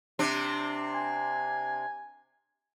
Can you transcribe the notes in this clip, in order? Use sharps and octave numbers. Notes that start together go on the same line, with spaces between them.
C3 C4 D4
G#5